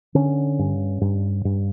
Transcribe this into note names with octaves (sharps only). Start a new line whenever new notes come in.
D3 C#4
G2
G2
G2